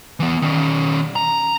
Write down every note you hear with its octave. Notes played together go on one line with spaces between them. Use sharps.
E3 B3
D#3 C#4
A#5